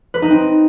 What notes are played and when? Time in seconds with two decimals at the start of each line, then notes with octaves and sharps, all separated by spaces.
0.14 B4
0.22 D#4
0.31 C4